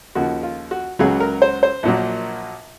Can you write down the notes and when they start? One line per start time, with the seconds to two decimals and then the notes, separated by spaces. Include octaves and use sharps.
0.15 D#2 C#3 F3 F#4
0.43 F4
0.71 F#4
0.99 C#2 C#3 F#3 G#4
1.20 A#4
1.42 C5
1.63 C5
1.83 A#1 A#2 F#3